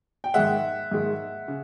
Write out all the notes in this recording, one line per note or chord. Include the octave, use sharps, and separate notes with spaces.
G5
G#2 D#3 G#3 E5 F#5
G#2 D#3 G#3
C#3